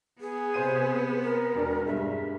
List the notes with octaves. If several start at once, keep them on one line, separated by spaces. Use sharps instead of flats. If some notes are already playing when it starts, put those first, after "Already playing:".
B3 G#4
C3 C5 D#7
A#4
E1 D4
G2 G#3 E5